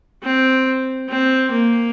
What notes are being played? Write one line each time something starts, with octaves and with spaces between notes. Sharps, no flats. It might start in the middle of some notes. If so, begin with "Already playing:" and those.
C4
C4
A#3